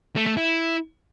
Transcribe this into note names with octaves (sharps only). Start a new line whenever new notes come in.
A3
A3
E4